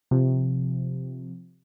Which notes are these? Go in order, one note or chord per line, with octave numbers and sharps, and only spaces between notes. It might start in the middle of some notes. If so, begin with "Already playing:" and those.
C3 F3